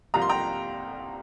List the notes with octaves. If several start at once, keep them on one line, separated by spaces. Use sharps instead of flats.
C2 C3 F3 A#3 F4 A#5
C6
G5 A#5